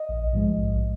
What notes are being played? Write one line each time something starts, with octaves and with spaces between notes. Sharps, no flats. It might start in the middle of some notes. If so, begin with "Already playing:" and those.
Already playing: D#5
A#1
G#2 F3 G#3
A#1